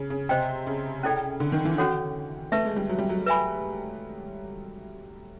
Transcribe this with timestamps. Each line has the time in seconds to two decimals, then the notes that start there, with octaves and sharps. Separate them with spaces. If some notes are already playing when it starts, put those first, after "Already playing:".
Already playing: C#3
0.10 C#3
0.29 C3 C5 D#5 G5
0.67 C#3
1.03 C#4 E4 A4 D5 G5
1.40 D3
1.52 D#3
1.65 E3
1.78 C#4 F#4 A4 C#5 F#5
2.52 A3 B4 E5 A5 C#6
2.65 G#3
2.76 G3
2.89 F#3
2.99 G3
3.09 F#3
3.26 B4 E5 G#5 B5